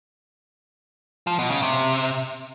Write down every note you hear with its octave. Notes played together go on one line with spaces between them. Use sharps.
F3
B2
C#3
C3